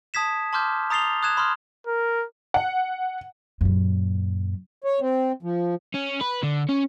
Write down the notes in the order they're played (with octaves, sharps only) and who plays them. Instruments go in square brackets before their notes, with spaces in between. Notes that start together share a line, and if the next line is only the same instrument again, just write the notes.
[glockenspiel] A5 D#6 G#6 B6 E7
A5 C6 D6 F6 G6
A#5 D#6 A6 C7 F7 G7
D#6 F#6 G#6 E7
B5 C6 D#6 F6
[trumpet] A#4
[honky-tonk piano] F#5
[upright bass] F#2 A#2
[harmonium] C#5
C4
F3
[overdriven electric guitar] C#4
B4
D3
C#4